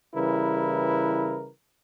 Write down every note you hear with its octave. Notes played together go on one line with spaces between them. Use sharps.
C#3 E3 G3 E4 A#4 B4